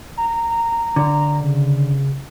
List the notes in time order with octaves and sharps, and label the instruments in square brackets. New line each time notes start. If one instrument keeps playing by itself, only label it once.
[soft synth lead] A#5
[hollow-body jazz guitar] D3
[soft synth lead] C#3